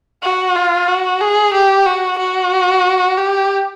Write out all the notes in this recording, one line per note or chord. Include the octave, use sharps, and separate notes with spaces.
F#4
F4
F#4
G#4
G4
F#4
F#4
G4